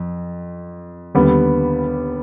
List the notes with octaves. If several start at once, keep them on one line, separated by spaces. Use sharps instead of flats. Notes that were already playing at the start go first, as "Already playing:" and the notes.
Already playing: F2
D#2 D3 G3 B3